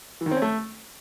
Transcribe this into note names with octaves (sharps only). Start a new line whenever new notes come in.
E3
D#3
C4
C#4
A3